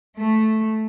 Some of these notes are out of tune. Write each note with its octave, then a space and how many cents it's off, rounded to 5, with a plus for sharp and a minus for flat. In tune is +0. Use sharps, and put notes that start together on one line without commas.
A3 -5